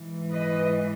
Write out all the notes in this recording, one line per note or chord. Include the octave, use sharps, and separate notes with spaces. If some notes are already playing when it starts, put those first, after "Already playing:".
Already playing: G#2 E3
B4 D#5